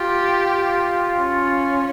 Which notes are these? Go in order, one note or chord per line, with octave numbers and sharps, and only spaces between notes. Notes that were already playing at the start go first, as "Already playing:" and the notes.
Already playing: F4 G4
C#4